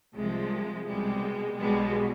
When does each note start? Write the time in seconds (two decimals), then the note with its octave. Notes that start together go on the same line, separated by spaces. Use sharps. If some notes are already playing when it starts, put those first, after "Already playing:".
0.14 C2 C3 F3 G#3
0.87 C2 B2 G3 G#3
1.59 B1 B2 G3 G#3